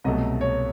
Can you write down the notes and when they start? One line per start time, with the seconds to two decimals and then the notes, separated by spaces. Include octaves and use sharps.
0.04 C2 B2 F#3 A3 D#5
0.41 C#5